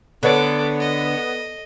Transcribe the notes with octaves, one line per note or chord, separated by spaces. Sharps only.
D3 B3 A4 B4 C#5 D5 D6
D#5